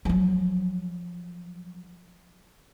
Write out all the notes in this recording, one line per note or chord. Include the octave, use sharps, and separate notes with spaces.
F3 F#3